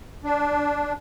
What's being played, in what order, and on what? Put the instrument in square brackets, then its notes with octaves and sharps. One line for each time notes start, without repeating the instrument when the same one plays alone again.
[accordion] D4